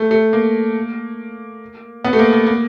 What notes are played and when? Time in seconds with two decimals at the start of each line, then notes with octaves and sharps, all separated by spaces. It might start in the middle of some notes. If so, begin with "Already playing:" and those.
Already playing: A3
0.11 A3
0.33 A#3
2.04 B3
2.13 A3
2.19 A#3
2.33 A#3
2.47 A#3